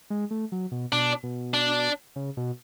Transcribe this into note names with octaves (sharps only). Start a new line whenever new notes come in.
G#3
A3
F#3
B2
B2 D4
B2
D4
C#3
B2